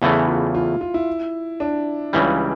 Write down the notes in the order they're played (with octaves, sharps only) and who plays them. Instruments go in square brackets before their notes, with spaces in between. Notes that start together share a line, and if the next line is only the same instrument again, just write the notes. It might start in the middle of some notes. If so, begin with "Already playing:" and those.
[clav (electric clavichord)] E2 C#3 E3 A3 [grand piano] E4
[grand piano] F4
F4
F4
E4
D4
[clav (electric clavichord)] C#2 C#3 E3 G3